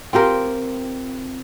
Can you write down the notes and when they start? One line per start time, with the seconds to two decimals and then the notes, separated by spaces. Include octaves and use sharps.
0.13 C4 F4 G4 A#4